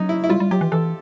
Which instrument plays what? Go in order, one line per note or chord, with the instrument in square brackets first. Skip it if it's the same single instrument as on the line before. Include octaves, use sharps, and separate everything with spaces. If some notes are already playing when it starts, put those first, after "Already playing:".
Already playing: [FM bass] F#3 [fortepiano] C#4 D#4
[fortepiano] E4
E4
[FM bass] G3 [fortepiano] F4
[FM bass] G3
[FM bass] F#3 [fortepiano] G4
[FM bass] E3
[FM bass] E3 [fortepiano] A4